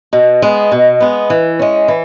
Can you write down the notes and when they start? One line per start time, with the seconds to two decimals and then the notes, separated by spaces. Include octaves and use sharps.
0.13 B2
0.42 G#3 B3
0.72 B2
1.00 G#3 B3
1.30 E3
1.59 G#3 C#4
1.88 E3